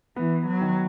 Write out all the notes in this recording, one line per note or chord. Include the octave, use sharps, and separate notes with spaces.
E3 B3
F#3
D#3